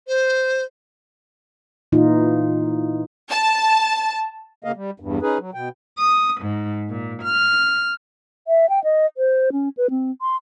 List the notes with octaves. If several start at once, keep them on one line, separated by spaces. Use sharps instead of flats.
C5
A#2 E3 D#4 F4
A5
C#3 A#3 D#5 F5
G3
E2 G2
C#4 D#4 G#4 B4
F#3
B2 G5
D#6
G#2
A#2
F6
E5
G5
D#5
C5
C#4
B4
C4
C6